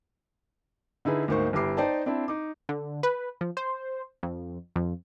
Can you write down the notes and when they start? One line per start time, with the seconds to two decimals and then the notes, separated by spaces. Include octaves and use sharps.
1.05 D3 D#4 E4 G#4 B4
1.28 D2 G#2 A#3 D#4 C5 C#6
1.53 G1 E4 G4 D6 C7
1.77 D#4 C5 D5 G5 A5
2.06 C4 D4 E4
2.28 D#4 D6
2.69 D3
3.03 B4
3.41 F3
3.57 C5
4.23 F2
4.76 F2